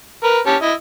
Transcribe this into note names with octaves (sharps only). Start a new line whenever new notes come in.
A#4 B4
C#4 G4 A5
E4 D#5